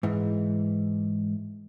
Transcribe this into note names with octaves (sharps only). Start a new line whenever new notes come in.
G#2 E3